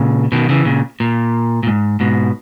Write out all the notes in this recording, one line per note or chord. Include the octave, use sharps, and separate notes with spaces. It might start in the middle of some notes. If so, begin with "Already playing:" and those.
Already playing: A#2 C#3
B2 D#3
C#3 E3
A#2 C#3
A#2
A#2
G#2
G#2 B2